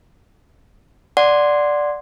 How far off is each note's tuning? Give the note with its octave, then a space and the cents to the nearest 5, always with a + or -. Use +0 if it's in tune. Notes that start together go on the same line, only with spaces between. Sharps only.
D5 +0 F#5 -5 C6 +0